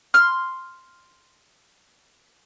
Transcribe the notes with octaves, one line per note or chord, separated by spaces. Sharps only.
C6 F6